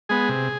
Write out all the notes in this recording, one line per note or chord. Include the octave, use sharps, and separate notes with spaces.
G#3 B3 G#4
C3